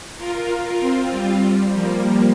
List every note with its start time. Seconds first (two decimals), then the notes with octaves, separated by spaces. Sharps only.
0.18 F4 A#4
0.80 C4 F4
1.11 G3
1.73 F3 A#3